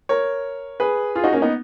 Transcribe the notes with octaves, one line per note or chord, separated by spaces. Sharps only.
A#4 C#5
G#4 B4
F4 G#4
D#4 F#4
A#3 C#4
B3 D#4